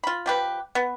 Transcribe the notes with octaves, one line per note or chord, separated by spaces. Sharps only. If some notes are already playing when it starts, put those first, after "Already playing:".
F4 B5
F3 G4 B4
B3